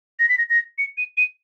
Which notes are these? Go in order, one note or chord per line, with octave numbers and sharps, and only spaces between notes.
A#6
B6
A#6
A#6
C#7
D#7
D#7